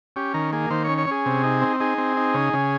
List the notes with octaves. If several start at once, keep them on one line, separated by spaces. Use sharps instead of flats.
C#4 G4
D#3 A#4
A#3 G#4
D#3 C5
C#4 C#5
C#5
C#4 G#4
C3
D#4
C4
D#4 G#4
C4
D#4
C#3
C#3